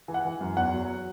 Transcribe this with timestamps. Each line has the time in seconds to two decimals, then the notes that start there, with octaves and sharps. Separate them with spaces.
0.08 E3
0.14 F#5
0.25 E3
0.41 F#2
0.57 E2 F#5
0.73 F#3